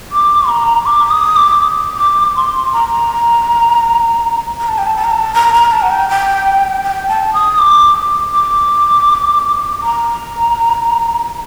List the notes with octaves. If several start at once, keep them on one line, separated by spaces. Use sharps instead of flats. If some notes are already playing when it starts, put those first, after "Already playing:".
D6
A#5
D6
D#6
D6
D6
C6
A#5
A#5
A5
G5
A5
A5
A#5
A5
A#5
A#5
A5
F#5
G5
G5
G5
A5
D#6
D6
D6
A#5